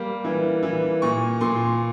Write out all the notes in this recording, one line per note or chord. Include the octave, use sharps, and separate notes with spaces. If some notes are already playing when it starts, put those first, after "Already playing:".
Already playing: G3 A#3
E3
E3
A#2 C#6
A#2 C6